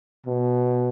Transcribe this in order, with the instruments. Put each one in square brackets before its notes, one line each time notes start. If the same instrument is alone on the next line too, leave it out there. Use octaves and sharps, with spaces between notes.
[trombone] B2